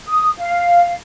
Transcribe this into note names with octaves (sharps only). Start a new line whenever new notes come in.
D#6
F5